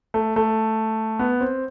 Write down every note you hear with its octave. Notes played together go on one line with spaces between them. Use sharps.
A3
A3
B3
C4